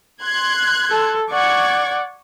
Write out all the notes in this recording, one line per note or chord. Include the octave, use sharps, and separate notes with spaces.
C6 F#6 G#6
A4
D5 F#5 C#6 G#6